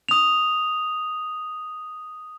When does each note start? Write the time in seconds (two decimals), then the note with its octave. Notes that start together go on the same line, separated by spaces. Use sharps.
0.09 D#6 F7